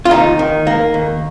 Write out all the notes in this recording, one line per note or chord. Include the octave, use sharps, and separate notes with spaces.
F4
D#2 D#4
D#3
A#3
D#2